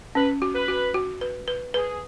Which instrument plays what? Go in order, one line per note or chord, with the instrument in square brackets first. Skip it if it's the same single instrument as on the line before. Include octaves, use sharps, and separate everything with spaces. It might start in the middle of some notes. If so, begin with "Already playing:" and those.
[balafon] C#4 [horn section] B4
[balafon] F#4
[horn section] B4
[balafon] F#4
F#4
B4
B4
[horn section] G#4 [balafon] B4